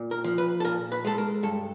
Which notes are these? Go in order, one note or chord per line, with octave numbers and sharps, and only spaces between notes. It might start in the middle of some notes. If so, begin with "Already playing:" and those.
Already playing: A#2
A#4
F3
B4
A4
A#2 A#4
B4
G#3 A4
A#4
G2 A4